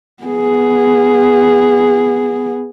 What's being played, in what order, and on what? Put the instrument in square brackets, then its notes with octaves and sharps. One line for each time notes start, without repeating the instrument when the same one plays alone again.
[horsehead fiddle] B3 G#4